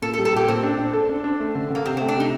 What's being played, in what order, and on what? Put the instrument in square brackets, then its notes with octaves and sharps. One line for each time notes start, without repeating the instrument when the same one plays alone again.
[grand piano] A#2 [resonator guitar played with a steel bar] A4
[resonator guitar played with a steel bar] A4
[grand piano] G3
[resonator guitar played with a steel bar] A4
[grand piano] A#2 [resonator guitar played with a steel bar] G4
[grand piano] A#2 [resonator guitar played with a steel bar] C4
[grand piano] D4
D4
A4
D4
D4
A3
D3
[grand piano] D3 [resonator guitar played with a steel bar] A#3
[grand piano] C3 [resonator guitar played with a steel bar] C4
[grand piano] A3 [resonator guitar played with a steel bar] C4
[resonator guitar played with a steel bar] D4
[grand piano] C3 [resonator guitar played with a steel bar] D#4